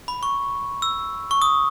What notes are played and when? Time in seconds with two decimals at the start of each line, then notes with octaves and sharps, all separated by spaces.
0.08 B5
0.23 C#6
0.82 E6
1.31 C#6
1.42 D#6